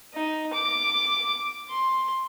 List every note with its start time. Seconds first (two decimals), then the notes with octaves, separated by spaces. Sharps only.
0.14 D#4
0.53 D6
1.70 C6